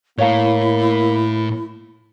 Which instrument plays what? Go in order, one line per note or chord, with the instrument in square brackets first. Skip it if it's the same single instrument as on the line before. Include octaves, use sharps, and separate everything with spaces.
[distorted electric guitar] A2 [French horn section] A#3 [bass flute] E4 [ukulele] C#5 F5 A#5